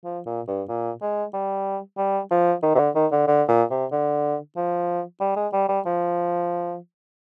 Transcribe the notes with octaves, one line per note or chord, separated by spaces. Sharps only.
F3
A#2
G2
A#2
G#3
G3
G3
F3
D#3
C3
D3
D#3
D3
D3
A#2
C3
D3
F3
G3
G#3
G3
G3
F3